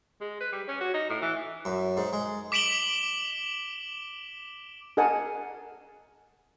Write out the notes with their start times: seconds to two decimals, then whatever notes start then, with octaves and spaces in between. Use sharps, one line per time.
0.21 G#3
0.40 B4
0.53 G3
0.68 C#4
0.80 F#4
0.94 D#4
1.09 A2
1.22 E3
1.65 F#2
1.97 G#2
2.13 G#3
2.52 D6 B6 D7 E7 F#7 G7
4.97 G#4 A#4 D#5 F#5 G#5 A5